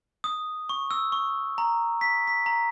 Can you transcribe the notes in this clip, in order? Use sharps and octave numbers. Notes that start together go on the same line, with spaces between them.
D#6
C#6
E6
C#6
A#5
B6
B6
A#5